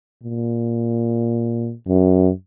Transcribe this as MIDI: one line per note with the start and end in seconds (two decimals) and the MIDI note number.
0.24 1.73 46
1.88 2.31 42